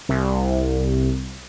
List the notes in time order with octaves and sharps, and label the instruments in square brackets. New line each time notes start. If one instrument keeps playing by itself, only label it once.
[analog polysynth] C2